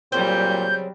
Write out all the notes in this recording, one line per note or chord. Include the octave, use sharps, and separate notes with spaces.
A#2 C#3 F#3 G3 C4 G6